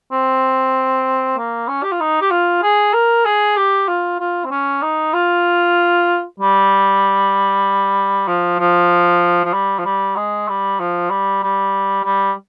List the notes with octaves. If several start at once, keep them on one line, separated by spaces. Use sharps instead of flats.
C4
A#3
C#4
G4
F4
D#4
G4
F4
G#4
A#4
G#4
G4
F4
F4
C4
C#4
D#4
F4
G3
F3
F3
F3
G3
F3
G3
G#3
G3
F3
G3
G3
G3